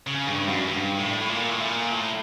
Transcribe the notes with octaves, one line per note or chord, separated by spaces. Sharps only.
C#3
G2
F#2
G2
A2
A2
A#2
A2
A#2
A2